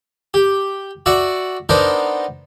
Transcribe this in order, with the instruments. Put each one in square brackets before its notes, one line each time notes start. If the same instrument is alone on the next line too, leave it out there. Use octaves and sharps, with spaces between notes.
[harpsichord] G4
F#4 D5 E5 F#5
B3 D4 D#4 A#4 C5